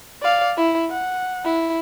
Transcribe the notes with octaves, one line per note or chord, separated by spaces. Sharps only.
D5 F5
E4
F#5
E4